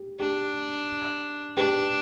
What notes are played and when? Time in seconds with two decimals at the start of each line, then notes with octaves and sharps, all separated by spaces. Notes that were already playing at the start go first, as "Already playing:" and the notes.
Already playing: G4
0.20 D4 G4
1.57 D4 G4 B4